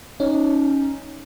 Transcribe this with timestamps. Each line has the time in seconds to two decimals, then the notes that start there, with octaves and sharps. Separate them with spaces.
0.20 C#4 D#4